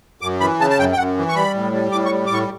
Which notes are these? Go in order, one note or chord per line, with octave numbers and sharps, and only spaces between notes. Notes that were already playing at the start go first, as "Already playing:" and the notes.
F#2 D6
E3 B5
C#3 A5
A5
F#2 G5
G5
F#2 F#5
E3
C#6
G3 B5
A2
G3
A2 D6
C#6
G3
D6
A2 C#6